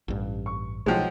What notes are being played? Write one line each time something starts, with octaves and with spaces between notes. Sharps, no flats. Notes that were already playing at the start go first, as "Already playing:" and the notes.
A1 G2
C#6
B1 F3 F#3 G#3 D#5 F#5 G5